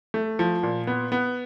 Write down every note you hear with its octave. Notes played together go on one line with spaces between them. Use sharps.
A3
F3
A#2
B3
B3